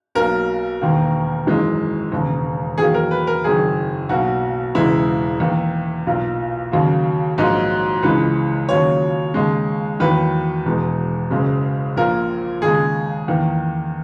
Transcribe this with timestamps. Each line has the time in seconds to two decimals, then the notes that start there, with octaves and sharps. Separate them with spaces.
0.15 B1 B2 F#3 A#3 A#4
0.81 E1 D#2 D#3 A#3
1.46 G#1 F#2 E3 G#3
2.12 E1 D#2 C#3
2.78 E2 D#3 F#3 A#3 G#4
2.94 A#4
3.11 B4
3.27 A#4
3.44 F#1 F#2 D#3 G#4
4.09 B1 B2 F#3 A#3 F#4
4.75 E1 E2 C#3 G#3 E4
5.40 E2 D#3 A#3
6.07 B1 A#2 A#3
6.72 D#2 C#3 F#3 A#3
7.38 A#1 G#2 F#3 A#3 D#4
8.03 C#2 C#3 E3 G#3 B4
8.69 D#2 C#3 F#3 A#3 C#5
9.34 D#2 C#3 G#3
10.00 E2 D#3 F#3 A#3 B4
10.66 E1 E2 B2 G#3
11.31 F#1 F#2 C#3 G#3
11.96 A#1 A#2 A#3 A#4
12.62 D#2 C#3 G#3 G#4
13.28 E2 D#3 A#3